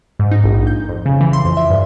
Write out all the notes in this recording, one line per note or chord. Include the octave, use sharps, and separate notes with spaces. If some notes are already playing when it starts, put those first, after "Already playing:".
G#2
D#4
A#1
G6
F2
C#3
E3
C6
F2
E5
G2